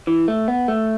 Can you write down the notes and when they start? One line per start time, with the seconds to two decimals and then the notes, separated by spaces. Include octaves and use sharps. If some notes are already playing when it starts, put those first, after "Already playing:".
0.07 E3
0.28 A3
0.48 B3
0.68 A3